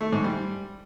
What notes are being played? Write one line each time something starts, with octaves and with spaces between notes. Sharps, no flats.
A3
G#2
G3